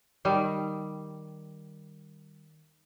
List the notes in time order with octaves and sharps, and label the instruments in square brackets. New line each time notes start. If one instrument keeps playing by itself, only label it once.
[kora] D#3 G3